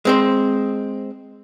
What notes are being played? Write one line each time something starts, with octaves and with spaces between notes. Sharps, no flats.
G#3 C4 C5